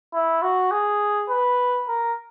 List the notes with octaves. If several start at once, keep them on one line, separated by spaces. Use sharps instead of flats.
E4
F#4
G#4
B4
A#4